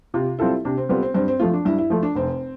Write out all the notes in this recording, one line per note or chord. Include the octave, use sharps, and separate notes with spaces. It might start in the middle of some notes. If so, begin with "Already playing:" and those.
C3 F4
G3 C4 E4 F4 A4
C3 D4
C4
G3 B3 C4 F4 A4
C4
G2 C4
C4
F3 A3 F4
D4
G2 E4
E4
F3 A3 F4
D4
F1 C4